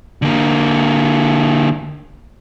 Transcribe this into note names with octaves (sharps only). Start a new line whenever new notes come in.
D3 A#3